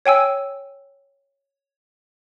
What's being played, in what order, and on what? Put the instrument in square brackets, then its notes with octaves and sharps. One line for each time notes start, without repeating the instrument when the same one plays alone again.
[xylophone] C#5 G5 G#5 E6